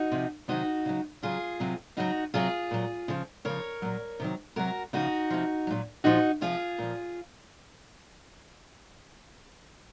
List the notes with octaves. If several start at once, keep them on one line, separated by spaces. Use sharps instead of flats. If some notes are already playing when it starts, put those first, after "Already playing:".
Already playing: D#4 F#4
C3 F3
C3 D#3 F#3 D#4 F#4
C#3 F#3
C#3 F#3 F4 G#4
C3 F#3
C#3 F#3 D#4 F#4
C3 F#3 F4 G#4
A#2 F#3
C#3 F3
C#3 F3 A#4 C#5
A#2 F#3
C3 D#3 F#3
C3 F#3 F#4 A#4
C#3 F3 D#4 F#4
C3 F3
A#2 F#3
A#2 F3 D#4 F#4
C3 F3 F4 G#4
A#2 F3